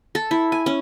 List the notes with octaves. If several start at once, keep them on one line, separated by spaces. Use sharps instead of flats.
A4
E4
G#5
C#4